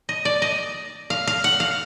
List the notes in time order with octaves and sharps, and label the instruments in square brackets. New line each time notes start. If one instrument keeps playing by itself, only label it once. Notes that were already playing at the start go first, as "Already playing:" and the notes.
[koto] D#5
D5
D#5
F5
F5
F#5
F5